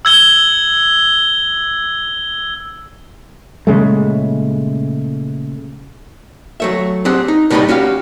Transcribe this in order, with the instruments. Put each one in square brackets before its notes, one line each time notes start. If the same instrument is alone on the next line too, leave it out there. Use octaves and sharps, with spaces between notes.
[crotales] E6 G#6 G7
[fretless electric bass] A#2 C#3 G#3 A3
[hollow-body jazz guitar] F#3 A3 E5
C4 G4 G#4 F#5
D#4
A2 C3 G3 D#4 B4 D#5
C#4 F#4 G4 F5